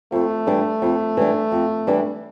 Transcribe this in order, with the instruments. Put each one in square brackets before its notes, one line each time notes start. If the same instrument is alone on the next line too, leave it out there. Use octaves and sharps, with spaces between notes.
[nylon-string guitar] F2 [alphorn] A3
[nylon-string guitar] E3 G3 D4
F2
E3 G3 D4
F2
E3 G3 D4